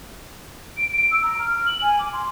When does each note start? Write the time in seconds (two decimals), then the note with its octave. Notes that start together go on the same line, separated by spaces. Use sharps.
0.77 D7
0.91 D7
1.11 E6
1.23 A#5
1.39 F6
1.54 F6
1.66 F#7
1.81 G#5
1.98 D6
2.13 C6